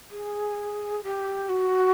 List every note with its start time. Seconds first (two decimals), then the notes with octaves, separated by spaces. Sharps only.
0.11 G#4
1.03 G4
1.49 F#4